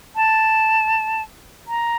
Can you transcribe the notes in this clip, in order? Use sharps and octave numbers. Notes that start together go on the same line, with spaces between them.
A5
A#5